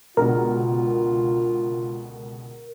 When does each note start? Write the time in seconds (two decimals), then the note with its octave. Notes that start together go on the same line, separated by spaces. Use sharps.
0.17 C#2 B2 D3 F4 A#4